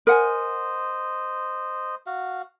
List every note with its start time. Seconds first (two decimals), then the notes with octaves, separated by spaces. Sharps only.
0.07 A#4 C5 D#5 F#5 G#5
2.07 F#4 F5